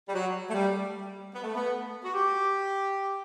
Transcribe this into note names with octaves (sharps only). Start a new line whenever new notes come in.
G3
F#3
A3
G3
B3
A3
B3
F#4
G4